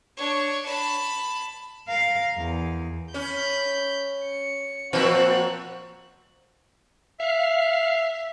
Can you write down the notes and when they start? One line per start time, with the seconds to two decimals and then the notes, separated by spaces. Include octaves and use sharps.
0.17 D4 C#5
0.65 A5 B5
1.88 A#4 F5
2.38 E2
3.14 C#4 B5 G6
4.24 C#7
4.93 A#2 F3 F#3 C4 F#4 F#6
7.20 E5 F5